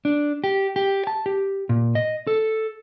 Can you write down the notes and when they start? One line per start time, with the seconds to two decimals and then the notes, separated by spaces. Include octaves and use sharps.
0.05 D4
0.44 G4
0.76 G4
1.07 A5
1.26 G4
1.69 A#2
1.95 D#5
2.27 A4